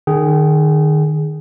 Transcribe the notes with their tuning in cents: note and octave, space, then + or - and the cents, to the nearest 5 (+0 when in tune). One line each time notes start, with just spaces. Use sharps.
D#3 -30 G#4 +0 G5 -35